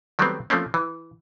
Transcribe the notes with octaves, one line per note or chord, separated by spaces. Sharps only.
D#3 F#3 G3 A3 B3 C4
F3 A3 A#3 C4 C#4
E3